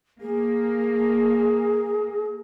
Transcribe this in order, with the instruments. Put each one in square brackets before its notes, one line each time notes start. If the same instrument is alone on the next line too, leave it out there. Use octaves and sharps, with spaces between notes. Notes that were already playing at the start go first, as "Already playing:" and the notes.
[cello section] A#3 [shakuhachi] G#4